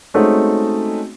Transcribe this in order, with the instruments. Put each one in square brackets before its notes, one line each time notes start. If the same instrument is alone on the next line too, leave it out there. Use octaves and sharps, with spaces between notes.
[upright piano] G#3 A3 C4 C#4 D#4 F#4